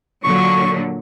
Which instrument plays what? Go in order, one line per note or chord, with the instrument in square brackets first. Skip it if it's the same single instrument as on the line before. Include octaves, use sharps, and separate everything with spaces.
[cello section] A#2 D3 F#3 [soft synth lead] C#6